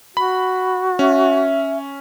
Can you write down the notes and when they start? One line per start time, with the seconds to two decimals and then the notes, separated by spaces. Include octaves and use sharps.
0.17 F#4 B5
0.99 C#4 E5